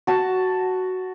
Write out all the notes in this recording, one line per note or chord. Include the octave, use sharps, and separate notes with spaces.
F#4 A5